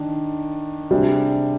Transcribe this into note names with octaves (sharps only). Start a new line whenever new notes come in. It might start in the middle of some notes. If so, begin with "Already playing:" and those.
Already playing: D#3 D4
C3 G3 D4 G#4